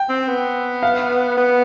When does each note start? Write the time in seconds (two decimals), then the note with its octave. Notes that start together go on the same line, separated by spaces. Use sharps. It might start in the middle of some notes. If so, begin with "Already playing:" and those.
Already playing: G5
0.09 C4
0.28 B3
0.83 F5
1.37 B3